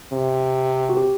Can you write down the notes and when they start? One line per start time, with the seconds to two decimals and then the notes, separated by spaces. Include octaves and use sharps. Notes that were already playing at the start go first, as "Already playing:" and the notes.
0.12 C3
0.89 F#4
0.97 G4